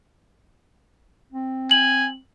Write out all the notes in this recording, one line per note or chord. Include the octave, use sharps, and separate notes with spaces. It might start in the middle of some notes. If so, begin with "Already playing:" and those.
C4
G#5 F#7